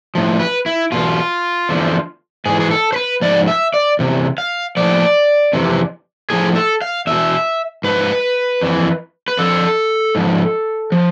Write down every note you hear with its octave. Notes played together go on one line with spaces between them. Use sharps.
A2 F3
B4
E4
E2 B2 F4
E2 D3 F3
G#2 E3 G#4
G#4
A4
C5
B4
G#2 F3 D5
E5
D5
E2 C3
F5
A2 F3 D5
F2 C3 E3
A2 F3 G#4
A4
F5
E2 B2 E5
G#2 F3 B4
F2 E3
B4
F2 D3 F3 A4
G#2 F3
F3